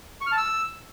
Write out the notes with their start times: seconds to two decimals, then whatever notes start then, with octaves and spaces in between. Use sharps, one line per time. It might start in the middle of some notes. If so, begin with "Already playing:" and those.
0.21 C#6
0.27 F6
0.32 A5
0.37 E6